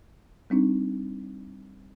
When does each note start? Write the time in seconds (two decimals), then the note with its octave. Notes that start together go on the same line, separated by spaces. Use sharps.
0.50 G3 C4 D4 D#4